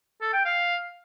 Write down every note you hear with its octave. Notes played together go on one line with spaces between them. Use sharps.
A4
G5
F5